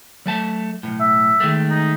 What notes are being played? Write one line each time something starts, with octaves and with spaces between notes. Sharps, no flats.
F#3 A3 A5
B1 F#2 A2
E5
D#3 G#3 A3
D#4